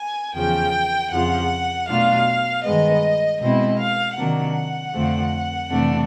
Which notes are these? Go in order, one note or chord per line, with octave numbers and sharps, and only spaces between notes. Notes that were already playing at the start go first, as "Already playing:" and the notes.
Already playing: G#5
E2 C#3 F3 G5
F2 C#3 F3 F#5
B2 F#3 A3 D4 F4 F5
G2 D#3 G#3 B3 D#5
B2 G#3 C4 E4 D#5
F5
C3 D#3 F#3 A#3 D4 F#5
F2 D3 F3 A3 C4
F2 C3 E3 A3 D4